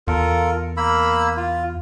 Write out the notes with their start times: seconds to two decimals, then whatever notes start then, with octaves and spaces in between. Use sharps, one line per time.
0.07 E2 F4 A4 A#4
0.77 A#3 B5 E6
1.37 F4